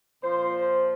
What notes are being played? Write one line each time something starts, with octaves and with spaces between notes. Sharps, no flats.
A#2 F3 C5